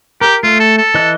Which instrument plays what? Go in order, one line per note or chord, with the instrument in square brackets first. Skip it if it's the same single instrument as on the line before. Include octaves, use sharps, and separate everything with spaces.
[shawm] G4 [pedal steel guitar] A#4
[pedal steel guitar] A3 [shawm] F4
[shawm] A4
A4
[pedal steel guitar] E3 D#5 F#6